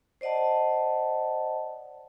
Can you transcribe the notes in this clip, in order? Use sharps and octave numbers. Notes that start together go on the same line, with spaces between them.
C5 D5 D#5 F#5 A5